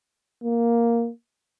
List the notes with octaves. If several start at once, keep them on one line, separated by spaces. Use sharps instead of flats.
A#3